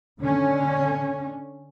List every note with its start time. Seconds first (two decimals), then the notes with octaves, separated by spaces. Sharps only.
0.20 D3 C#4